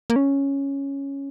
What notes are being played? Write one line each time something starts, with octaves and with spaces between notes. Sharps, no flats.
A#3
C#4